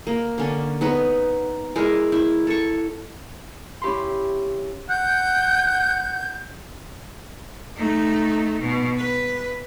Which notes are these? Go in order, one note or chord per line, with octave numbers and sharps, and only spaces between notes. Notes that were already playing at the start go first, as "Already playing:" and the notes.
A#3
D3 C#4 D4
B3 D#4 B4 C#5
G#3 E4 A#4
E4
A4 C#6
C#4 E4 G4 B5 C6
F#5 G6
A3 D#4
B2
B4